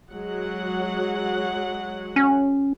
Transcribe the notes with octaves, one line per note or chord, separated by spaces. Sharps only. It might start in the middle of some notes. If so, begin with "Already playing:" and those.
F#3 G#3 F#5
C#4